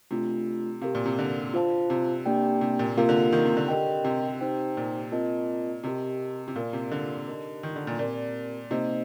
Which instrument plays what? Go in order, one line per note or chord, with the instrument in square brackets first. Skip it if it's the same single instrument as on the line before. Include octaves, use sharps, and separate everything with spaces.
[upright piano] C3 [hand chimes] A3 D4 F4
[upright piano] C3 [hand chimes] G4 A#4 F5
[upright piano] A#2
C3
D3
[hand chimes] F4 C5 F5 A5
[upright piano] C3
[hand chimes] A#3 D4 G4 D5 G5
[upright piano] C3
A#2
[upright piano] C3 [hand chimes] A#3 F4 A#4 F5
[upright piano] D3
D#3
C3
D3
[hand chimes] G4 A#4 D#5 G5
[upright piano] C3
[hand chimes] D#4 G4 C5 G5
[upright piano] A#2
[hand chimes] C4 F4 A#4 D#5 A5
[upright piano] C3 [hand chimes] G4 A#4 D#5 A5
[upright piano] C3
[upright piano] A#2 [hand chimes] F4 A#4 D5 F5
[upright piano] C3
D3
[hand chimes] D#4 G4 A#4 D#5 A5
[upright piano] D#3
D3
A#2
[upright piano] A#2 [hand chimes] C4 G4 A#4 D5 A5
[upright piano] C3 [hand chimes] A#3 D#4 G4 C5 D#5